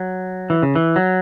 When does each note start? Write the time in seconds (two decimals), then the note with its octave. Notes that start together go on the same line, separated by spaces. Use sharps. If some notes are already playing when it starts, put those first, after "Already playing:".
Already playing: F#3
0.50 E3
0.63 C#3
0.75 E3
0.96 F#3